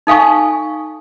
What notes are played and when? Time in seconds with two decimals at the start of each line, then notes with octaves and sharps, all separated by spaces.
0.07 D#4 A4 F5 G#5 C#6